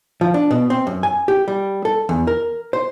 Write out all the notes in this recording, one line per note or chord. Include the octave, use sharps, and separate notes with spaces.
F3
D4
B2
C4
F#2
G#5
G4
G3
A4
E2
A#4
C5